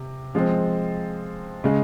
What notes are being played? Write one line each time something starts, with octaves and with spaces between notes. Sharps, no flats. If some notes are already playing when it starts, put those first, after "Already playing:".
Already playing: C3
F3 G#3 C4
C#3 G#3